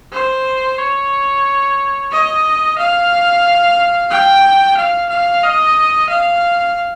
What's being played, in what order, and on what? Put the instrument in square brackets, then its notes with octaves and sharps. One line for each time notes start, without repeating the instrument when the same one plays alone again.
[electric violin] C5
C#5
D#5
F5
G5
F5
F5
D#5
F5